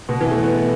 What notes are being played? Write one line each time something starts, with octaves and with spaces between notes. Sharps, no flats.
B2
E3
A3
B3